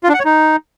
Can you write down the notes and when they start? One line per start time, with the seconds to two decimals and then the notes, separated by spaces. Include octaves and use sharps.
0.03 F4
0.09 D4
0.14 F#5
0.19 C#5
0.25 D#4